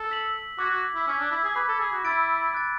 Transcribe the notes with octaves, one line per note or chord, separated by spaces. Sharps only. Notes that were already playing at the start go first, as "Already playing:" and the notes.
Already playing: A4
E6 B6 F#7
F#4 D6 G#6 B6
F#4
E4
C#4 E6 G#6 B6
D4
E4
G#4
B4 B5 D6 G#6 B6
A4
G#4
F#4
E4 B5 E6 A6 D7
D6 F#6 A6